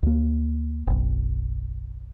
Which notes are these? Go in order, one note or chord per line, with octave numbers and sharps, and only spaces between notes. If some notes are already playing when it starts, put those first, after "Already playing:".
D2 A#3
F#1 B1